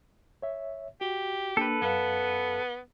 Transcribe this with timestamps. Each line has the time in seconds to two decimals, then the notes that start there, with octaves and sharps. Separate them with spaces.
0.42 C#5 E5
1.01 F#4 G4
1.57 A#3 D4 A4 B4
1.82 F#2 B3 F5